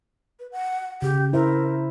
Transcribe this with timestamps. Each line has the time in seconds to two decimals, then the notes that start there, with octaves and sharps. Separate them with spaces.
0.40 B4
0.52 F#5
1.02 C#3 G4
1.33 E4 A#4 C5 E5